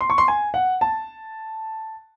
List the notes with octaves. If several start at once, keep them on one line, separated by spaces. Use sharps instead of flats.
C6
C#6
C6
G#5
F#5
A5